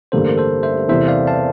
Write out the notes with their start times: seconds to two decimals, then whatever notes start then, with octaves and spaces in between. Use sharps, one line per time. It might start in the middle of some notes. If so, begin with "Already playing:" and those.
0.12 A1 G2 D3 G3 A#3 A4 C5
0.28 A#4
0.38 A4 C5
0.63 C5 E5
0.88 E2 C3 E3 C5 E5
1.08 D5 F5
1.27 F5 A5